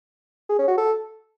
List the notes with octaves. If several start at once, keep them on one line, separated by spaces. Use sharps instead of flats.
G#4
C#4
F#4
A4